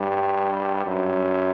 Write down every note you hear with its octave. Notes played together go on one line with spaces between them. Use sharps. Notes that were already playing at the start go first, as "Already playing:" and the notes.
Already playing: G2
F#2